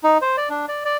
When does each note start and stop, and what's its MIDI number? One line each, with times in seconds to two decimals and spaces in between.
0.03 0.18 63
0.22 0.36 72
0.37 0.49 74
0.49 0.66 62
0.68 0.83 74
0.85 0.97 74